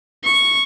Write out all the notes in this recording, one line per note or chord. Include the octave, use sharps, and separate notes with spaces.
C#6